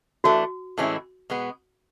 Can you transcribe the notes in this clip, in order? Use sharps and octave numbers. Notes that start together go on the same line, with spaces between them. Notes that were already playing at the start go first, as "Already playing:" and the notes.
E3 A3 D4 F#4
A2 E3 G#3 C#4 E4
B2 G#3 B3